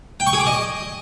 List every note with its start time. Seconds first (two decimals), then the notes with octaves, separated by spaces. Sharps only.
0.20 G5
0.27 C#6
0.33 G#4
0.40 D6
0.47 D#5